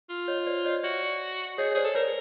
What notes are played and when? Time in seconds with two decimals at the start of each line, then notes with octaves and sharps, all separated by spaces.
0.09 F4
0.28 C#5 D#5
0.46 C5 D5
0.65 C#5 D#5
0.83 F#4 D5 E5
1.58 G#4 C#5 D#5
1.71 C#5
1.75 G#4 C5 D5
1.85 A4
1.95 A#4 B4 C#5